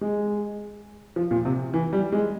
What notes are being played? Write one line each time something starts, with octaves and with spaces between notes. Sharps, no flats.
G#3
F3
A#2
C3
E3
G3
G#3